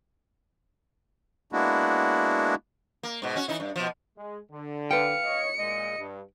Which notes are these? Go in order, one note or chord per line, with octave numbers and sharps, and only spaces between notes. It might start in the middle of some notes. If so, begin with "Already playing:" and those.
G#3 A#3 B3 D4 E4 F#4
A#3
G#2 B2
C#4 F#4
E3 D#4 E4
G2
B2 F3
G#3
D3
B4 F5 G5 C#7
C#5 D#5
A#2 G#3 D#5
G2